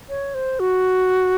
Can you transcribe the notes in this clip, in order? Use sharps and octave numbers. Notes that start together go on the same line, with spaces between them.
C#5
C5
F#4